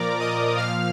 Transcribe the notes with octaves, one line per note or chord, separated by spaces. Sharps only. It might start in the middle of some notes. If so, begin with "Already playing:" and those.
Already playing: A#2 F3 A#4 D5 A#5 D6
D#5 D#6
A#2 F3 F5 F6